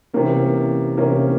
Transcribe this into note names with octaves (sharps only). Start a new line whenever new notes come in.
C3 E3 A#3 C#4
C3 E3 A#3 C#4